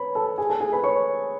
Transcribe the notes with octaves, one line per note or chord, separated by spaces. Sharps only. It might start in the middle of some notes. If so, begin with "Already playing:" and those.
Already playing: B4 C#5 B5
A4 A5
G#4 G#5
A4 A5
G#4 G#5
B4 B5
C#5 C#6